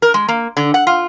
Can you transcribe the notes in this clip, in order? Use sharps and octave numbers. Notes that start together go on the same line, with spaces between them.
A#4
G#3
A#3
D3
F#5
F4